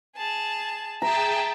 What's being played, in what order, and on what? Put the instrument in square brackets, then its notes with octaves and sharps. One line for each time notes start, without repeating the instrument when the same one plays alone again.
[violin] G#4 A5
[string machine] G#4 G5 A5 [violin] E5 [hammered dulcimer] A#5